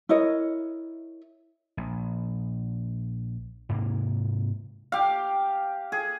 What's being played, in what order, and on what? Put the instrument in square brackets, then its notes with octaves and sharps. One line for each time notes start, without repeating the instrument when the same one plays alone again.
[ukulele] E4 A#4 C#5 D#5
[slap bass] A#1
G#2 C3 A#3
[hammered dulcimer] G4 F5
G#4